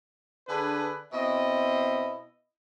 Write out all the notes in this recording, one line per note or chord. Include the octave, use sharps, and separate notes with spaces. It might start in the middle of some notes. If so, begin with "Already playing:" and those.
D3 D4 G#4 B4
B2 C4 E4 D#5